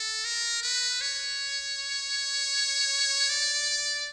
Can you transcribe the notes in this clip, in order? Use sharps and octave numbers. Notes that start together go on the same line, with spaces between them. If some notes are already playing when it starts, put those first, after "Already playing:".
Already playing: A4
A#4
B4
C#5
D5